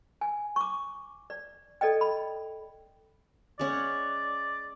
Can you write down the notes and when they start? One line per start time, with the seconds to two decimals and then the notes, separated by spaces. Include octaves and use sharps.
0.21 G#5
0.56 C#6 D6
1.30 D5
1.81 A4 D5 D#5 G5
2.01 B5
3.59 G#3 C#4 D5 F#5